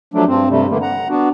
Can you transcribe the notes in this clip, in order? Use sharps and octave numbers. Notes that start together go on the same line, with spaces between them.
F3 F#3 A3 D4
G2 C4
G2 C3 G3 A3
D3 E3 A3 A#3
F#5 A#5
B3 D4 F#4